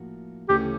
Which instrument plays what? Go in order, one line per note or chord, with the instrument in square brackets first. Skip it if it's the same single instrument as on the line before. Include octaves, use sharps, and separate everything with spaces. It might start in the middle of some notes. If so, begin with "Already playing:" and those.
Already playing: [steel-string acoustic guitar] A2 F3 A#3 F#4
[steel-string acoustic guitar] D2 C#3 E3 A3 C#4 [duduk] G4